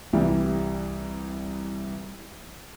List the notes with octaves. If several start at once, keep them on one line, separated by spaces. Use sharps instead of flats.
C2 E3 G3